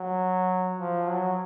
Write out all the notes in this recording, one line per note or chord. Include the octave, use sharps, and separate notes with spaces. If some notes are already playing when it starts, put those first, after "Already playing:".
Already playing: F#3
F3
F#3